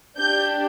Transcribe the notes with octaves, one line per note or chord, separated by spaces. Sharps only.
D4 G4 G6